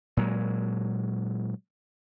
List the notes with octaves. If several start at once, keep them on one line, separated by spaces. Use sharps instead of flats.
A#2 F#3 G#3